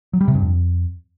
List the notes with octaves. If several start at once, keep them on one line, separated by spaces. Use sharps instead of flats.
F#3
G3
C3
G2
F2